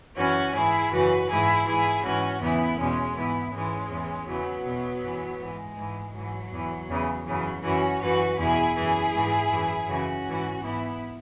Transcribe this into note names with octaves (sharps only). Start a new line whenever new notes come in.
F#2 E3 C#4 F#4
G#2 E3 E4 G#4
F#2 C#3 E3 F#4 B4
G#2 E3 E4 G#4
G#2 E3 E4 G#4
G#2 E3 C#4 F#4
E2 C#3 E3 B3 E4
E2 B2 G#3 C#4
G#2 E3 B3 E4
G#2 E3 G#3 C#4
E2 E3
E2 C#3 E3 F#3 B3
E2 B2
F#2 E3
G#2 E3 G#3
G#2 E3
G#2 E3 F#3
E2 E3
E2 C#3 E3
F#2 C#3 E3 F#3
F#2 E3 C#4 F#4
F#2 E3 F#4 B4
E2 B2 E4 G#4
F#2 E3 E4 G#4
G#2 E3
F#2 E3
F#2 C#3 E3 C#4 F#4
G#2 E3
G#2 E3 B3 E4